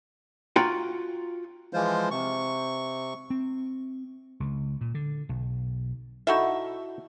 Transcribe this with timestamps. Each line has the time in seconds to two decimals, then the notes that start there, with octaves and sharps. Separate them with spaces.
0.56 F4 F#4 G5 A#5
1.73 E3 F3 G#3 F4 C5
2.11 C3 C#6
3.30 C4
4.40 C#2
4.81 A#2
4.95 D3
5.29 B1
6.27 D#4 E4 F#4 A4 E5